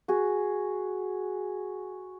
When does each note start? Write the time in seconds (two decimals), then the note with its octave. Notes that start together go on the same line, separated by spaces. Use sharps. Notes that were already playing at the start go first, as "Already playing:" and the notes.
0.08 F#4 G#4